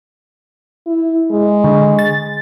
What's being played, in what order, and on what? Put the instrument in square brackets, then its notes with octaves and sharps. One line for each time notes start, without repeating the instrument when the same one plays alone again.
[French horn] E4
G#3
[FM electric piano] D3
A6